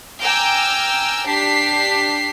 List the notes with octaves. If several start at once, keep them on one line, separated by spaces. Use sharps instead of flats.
G5 G#5 A#5 D6 E6 F6
D4 G4 B6 C7